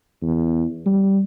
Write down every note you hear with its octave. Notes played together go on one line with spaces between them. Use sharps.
E2
G3